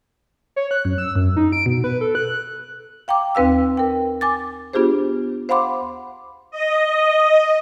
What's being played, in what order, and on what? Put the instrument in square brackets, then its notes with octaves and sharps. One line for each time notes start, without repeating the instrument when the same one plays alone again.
[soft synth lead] C#5
F#6
F#2
E6
F#2
D#4
D7
B2
B4
A4
F#6
[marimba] F5 G5 A#5 D6
D#2 C4 B4 F5 E6
A#4 G5
G#5 D6 A6
B3 D4 F4 G4 G#4 C5
C5 F5 F#5 B5 C6 D6
[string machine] D#5